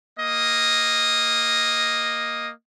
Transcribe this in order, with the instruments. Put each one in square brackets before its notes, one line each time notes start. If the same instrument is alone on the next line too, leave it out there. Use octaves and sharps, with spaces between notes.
[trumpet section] A#3 D#5